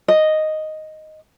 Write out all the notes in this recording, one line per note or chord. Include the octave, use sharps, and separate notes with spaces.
D#5